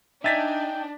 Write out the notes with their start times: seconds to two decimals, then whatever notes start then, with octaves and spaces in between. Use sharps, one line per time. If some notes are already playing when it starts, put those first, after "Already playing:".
0.24 D4 D#4 D#5 E5 G5 G#5 A6 B6